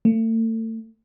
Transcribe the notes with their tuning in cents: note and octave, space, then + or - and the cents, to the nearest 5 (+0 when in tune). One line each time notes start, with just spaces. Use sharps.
A3 +35